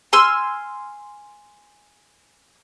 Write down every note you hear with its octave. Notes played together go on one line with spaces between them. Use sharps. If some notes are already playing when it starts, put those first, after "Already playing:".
G#5 C6 E6 F6